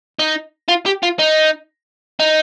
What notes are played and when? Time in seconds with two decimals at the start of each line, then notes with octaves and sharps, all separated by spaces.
0.19 D#4
0.69 F4
0.86 G4
1.03 F4
1.19 D#4
2.20 D#4